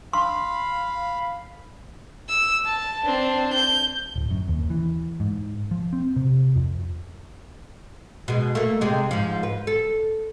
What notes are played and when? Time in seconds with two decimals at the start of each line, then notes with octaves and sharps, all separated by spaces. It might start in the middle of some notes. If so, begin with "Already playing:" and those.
0.13 F5 B5 C6
2.29 E6
2.66 A5
3.06 C4 D4
3.54 G6
4.16 D1
4.30 F#2
4.48 D#2
4.70 E3
5.20 G#2
5.71 F3
5.93 C4
6.16 C3
6.56 F2
8.28 B2 G#3
8.55 A3 A#3
8.81 C3 G#3
9.11 G#2 F3
9.43 B4
9.67 A4